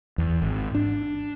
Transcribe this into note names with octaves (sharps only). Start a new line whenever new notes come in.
E2
G#1
D4